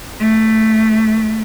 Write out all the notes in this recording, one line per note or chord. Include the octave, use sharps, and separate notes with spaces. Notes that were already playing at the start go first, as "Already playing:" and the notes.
A3